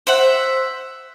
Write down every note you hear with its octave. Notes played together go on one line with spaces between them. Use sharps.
C5 E5 F#5